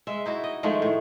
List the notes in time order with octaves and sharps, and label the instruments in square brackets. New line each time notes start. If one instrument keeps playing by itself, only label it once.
[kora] G#3 E5
D#4 E4 F#4
D#5
D#3 F3 G#3 A3
A2